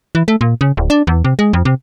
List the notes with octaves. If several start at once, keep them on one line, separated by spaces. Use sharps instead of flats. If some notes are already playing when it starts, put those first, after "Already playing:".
E3
A3
A#2
C#3
D1
D4
E2
C3
G#3
F2
C3